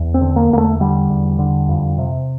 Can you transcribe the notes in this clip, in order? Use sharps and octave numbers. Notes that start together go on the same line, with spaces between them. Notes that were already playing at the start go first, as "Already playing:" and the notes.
Already playing: E2
C4
D3
A#3
E2 A#3
A3
D3 G3
E2
D3
F2
C3